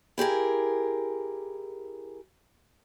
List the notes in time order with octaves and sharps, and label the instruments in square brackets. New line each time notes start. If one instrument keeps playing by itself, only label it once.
[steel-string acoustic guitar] E4 G4 G#4 A#4